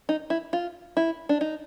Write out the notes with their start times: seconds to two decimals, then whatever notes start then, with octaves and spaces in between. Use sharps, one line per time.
0.09 D#4
0.30 E4
0.53 F4
0.97 E4
1.29 D4
1.41 D#4